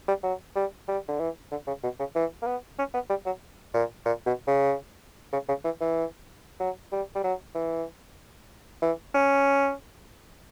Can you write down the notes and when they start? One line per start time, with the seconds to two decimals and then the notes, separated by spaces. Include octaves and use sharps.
0.08 G3
0.23 F#3
0.55 G3
0.88 G3
1.08 D3
1.19 E3
1.51 D3
1.67 C#3
1.83 B2
1.99 C#3
2.15 E3
2.42 A#3
2.46 B3
2.78 C#4
2.94 B3
3.09 G3
3.26 F#3
3.74 A#2
4.05 A#2
4.26 B2
4.47 C#3
5.33 C#3
5.48 C#3
5.65 E3
5.80 E3
6.60 F#3
6.92 G3
7.15 G3
7.24 F#3
7.55 E3
8.82 E3
9.14 C#4